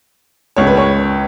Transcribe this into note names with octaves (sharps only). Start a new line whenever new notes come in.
C#2 C#3 C#5
B4
C#5